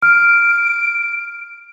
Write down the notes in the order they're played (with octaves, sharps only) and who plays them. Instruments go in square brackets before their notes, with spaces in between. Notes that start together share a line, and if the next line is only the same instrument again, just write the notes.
[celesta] F6 [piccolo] D7